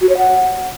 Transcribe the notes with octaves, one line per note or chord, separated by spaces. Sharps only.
F#4
C#5
F#5